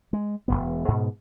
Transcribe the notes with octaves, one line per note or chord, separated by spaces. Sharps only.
G#3
E1 D#2 B3
G#2 B2